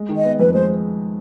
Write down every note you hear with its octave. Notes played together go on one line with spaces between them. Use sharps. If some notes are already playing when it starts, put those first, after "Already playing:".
Already playing: G#3
D#3
D#5
B3
F2 B4
G#3 C5